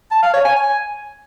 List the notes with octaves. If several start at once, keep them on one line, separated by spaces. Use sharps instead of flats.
A5
F5
C#5
G#5
G#5